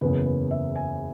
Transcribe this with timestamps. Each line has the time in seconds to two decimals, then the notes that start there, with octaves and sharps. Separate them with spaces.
0.01 F#1 E2 C#3 B4
0.26 B4
0.51 E5
0.75 G#5